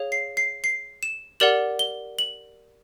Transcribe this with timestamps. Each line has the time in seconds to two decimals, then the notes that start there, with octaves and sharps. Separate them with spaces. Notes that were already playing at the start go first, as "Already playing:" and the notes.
Already playing: G#4 C#5 F5
0.12 C7
0.37 C7
0.64 C7
1.03 E7
1.40 G4 A#4 D5 F#5 F#7
1.79 G7
2.19 F#7